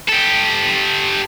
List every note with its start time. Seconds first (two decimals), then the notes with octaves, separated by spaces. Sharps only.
0.08 G4 A4